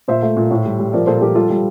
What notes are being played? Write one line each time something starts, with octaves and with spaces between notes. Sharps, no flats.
A#2 C5 E5
A3
A#2
A2
G3
G3
F3 A#4 D5
A#2 A4 C5
F3 G4 A#4
G3 F4 A4
G3